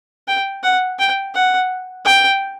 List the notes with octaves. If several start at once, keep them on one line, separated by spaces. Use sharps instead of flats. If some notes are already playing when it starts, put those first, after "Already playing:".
G5
F#5
G5
F#5
G5